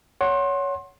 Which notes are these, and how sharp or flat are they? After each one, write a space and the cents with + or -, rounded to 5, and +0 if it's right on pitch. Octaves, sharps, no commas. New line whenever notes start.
C#5 +15 F#5 +0 C6 +25